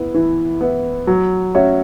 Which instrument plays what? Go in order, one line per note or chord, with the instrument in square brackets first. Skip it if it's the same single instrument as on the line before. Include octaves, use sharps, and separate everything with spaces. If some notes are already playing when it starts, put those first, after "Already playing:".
Already playing: [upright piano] B3 E4
E3
B3 E4
F#3
C#4 F#4 C#5 E5